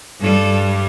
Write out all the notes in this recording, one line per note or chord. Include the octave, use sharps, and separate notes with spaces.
G2 G3 A4